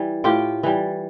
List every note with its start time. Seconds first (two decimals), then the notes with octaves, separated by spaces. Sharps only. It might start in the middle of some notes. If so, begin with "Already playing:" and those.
Already playing: E3 G3
0.24 A2 F4 G4
0.63 E3 G3